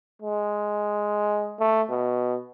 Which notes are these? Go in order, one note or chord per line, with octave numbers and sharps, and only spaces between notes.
G#3
A3
B2